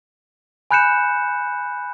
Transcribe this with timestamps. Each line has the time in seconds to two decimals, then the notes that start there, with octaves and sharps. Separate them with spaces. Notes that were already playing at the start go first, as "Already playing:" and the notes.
0.71 G#5 B5 F#6 G6 C#7 E7